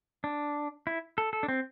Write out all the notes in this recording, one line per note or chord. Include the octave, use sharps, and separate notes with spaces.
D4
E4
A4
A4
D4
C4